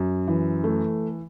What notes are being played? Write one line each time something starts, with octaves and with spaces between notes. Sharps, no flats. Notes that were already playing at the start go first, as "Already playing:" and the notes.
Already playing: F#2
E3
A3